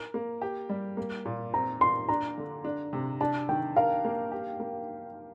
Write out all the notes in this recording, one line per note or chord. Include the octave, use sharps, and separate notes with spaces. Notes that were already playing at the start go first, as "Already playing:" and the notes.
Already playing: A#4
A#3
G4
G3
A#3
A#2
C4 A#5
A#2 C6
D4 A#5
D3
D4
C3
D4 A5
D#3 G5
A#4 F5
A#3
G4
A#3